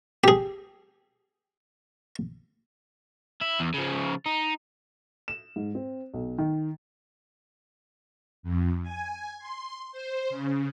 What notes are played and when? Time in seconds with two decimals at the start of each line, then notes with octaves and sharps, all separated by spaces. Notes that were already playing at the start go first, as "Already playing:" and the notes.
0.24 G4 G#4
3.41 E4
3.60 E2
3.74 C#3 F3
4.26 D#4
5.28 E7
5.56 G#2
5.75 C4
6.14 B1
6.38 D#3
8.43 F2
8.82 G#5
9.39 C6
9.92 C5
10.30 C#3